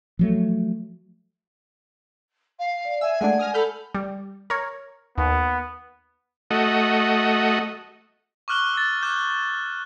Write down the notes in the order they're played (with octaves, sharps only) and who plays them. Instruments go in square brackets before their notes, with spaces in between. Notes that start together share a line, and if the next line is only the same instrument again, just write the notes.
[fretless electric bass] F3 F#3 A3
[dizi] F5
[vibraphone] D5
[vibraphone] E5 [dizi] G#5 [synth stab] E6
[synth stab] G#3 A3 D4 [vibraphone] D5 F#5
[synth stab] D#6 F6 A#6
[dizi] A4 [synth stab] B5 F6 G6
[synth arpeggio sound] G3
A#4 C#5
[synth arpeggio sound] D#2 [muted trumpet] B3
[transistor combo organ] A3 F#4 D#5
[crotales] C#6 D6 F6 F#6 F#7 G7
E6 A6
D6 F#6 G6